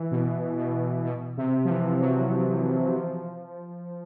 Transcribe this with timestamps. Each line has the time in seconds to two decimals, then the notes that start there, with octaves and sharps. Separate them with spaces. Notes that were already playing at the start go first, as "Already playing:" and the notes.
Already playing: E3
0.11 B2
0.57 B2
1.05 B2
1.37 C3
1.65 F3
1.68 E3
2.00 F#3
2.94 F3